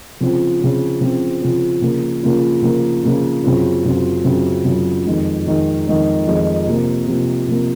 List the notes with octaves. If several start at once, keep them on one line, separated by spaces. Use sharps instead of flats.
C#3 F3 C4 F4
C#3 F3 C4 F4
C#3 F3 C4 F4
C#3 F3 C4 F4
C#3 F3 A#3 F4
C#3 F3 A#3 F4
C#3 F3 A#3 F4
C#3 F3 A#3 F4
F#2 C#3 F#3 C4 F4
F#2 C#3 F#3 C4 F4
F#2 C#3 F#3 C4 F4
F#2 C#3 F#3 C4 F4
F2 D#3 G#3 D#4
F2 D#3 G#3 D#4
F2 D#3 G#3 D#4
F2 D#3 G#3 D#4
C3 F3 A#3
C3 F3 A#3
C3 F3 A#3